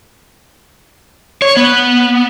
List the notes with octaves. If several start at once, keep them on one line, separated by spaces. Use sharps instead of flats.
C#5
B3